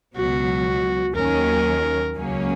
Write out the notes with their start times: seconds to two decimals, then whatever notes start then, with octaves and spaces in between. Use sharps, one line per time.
0.16 C#2 B2 F#3 F#4
1.16 D#2 D#3 F#3 C#4 A#4
2.15 C#2 C#3 F#3 A#3 C#4